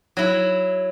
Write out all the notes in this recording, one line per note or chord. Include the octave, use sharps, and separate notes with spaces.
F#3 E4